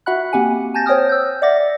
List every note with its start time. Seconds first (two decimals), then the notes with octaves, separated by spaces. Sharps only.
0.06 F#4 E5 F#5 B5 F#6
0.33 A#3 C4 G4 F#5 G#5
0.74 G#5 A5 G6 A6 A#6
0.86 C5 C#5 G5 D#6 F6
1.09 E6 G6
1.42 D5 E5 F#5 D6 A6 A#6